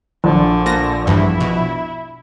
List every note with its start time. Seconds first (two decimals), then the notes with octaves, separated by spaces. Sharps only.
0.24 A#1 D3
0.66 A#2 A#6
1.07 E2 G2 E4
1.41 B2